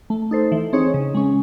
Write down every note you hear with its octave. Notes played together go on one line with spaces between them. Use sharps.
A3
D#4 A4 C5
E3
C4 D#4 G#4 C#5
C#3
G#3 C#4